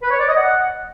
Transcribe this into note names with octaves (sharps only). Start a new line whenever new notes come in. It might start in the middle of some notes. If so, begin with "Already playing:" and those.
B4
C#5
D5
D#5
F#5